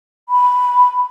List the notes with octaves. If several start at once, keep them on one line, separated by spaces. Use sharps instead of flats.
B5